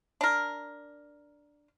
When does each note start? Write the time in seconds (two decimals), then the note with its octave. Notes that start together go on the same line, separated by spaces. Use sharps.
0.21 D4 A#4